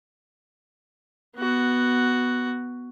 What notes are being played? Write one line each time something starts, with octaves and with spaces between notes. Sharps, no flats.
B3 F#4